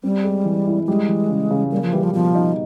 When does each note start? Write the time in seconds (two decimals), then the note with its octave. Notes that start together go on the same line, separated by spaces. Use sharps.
0.03 G3 C4
0.24 G#3
0.45 E3
0.66 E4
0.87 G3 G#3
1.08 E3
1.29 C#3
1.51 C#3
1.72 G3 A#3
1.82 F3
1.93 E3 G3
2.03 F3
2.13 B2 F3
2.35 D#4